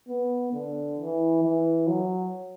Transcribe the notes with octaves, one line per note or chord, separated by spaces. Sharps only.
B3
D3
E3
E3
F#3